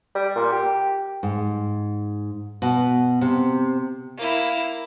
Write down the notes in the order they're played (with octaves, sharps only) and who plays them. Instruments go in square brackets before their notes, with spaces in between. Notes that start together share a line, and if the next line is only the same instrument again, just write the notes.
[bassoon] G3
A#2
G4
[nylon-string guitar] G#2
B2
C3
[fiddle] A#3 E4